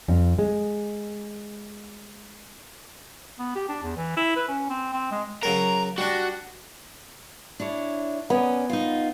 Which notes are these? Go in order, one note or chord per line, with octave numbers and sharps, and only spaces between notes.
F2
G#3
B3
G4
D4
E2
E3
E4
B4
C#4
C4
C4
G#3
C#3 F#3 A#4 A#5
G3 D4 F#4
D4 E4 C#5
B3 C#4 D5
D#4 F4